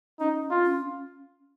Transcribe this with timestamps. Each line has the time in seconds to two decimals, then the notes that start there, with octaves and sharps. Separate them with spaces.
0.20 C#4 D#4
0.51 F4
0.65 C#4